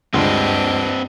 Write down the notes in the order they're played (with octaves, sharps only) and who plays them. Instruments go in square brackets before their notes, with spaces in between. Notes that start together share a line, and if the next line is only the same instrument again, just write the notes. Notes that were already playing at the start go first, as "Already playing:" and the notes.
[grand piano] D2 G#3 F4 [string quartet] G2 D4 D#5 [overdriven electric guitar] C4 B4